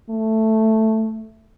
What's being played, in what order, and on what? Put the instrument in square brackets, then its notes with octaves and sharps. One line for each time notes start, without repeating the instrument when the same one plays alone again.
[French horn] A3